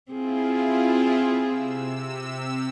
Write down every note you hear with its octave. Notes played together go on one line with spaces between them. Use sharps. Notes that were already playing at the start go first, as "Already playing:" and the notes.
C4 E4 F4 G#4
C3 E6